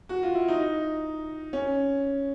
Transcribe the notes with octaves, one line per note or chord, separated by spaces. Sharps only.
F#4
F4
E4
D#4
C#4